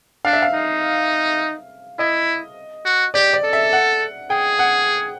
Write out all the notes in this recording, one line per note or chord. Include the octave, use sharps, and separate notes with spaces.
D4 F5
E5
F5
D#4
E4 D#5
F#4
G4 D5
D5
A4
E5
F#5
G#4 G5
F#5